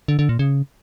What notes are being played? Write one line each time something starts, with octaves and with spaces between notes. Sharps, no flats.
D3
D3
A#2
C#3